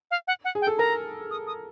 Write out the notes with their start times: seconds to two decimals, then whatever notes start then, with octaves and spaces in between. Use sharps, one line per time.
0.11 F5
0.27 F#5
0.45 F#5
0.55 G#4
0.61 G5
0.67 A4
0.78 A#4 A#5
1.31 D#6
1.47 D#6